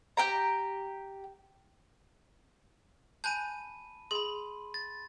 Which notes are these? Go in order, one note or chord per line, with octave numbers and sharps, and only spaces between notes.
G4 G5 A#5
G#5 A5 B5 F#6 G6 D#7
G#4 B5 C6
A6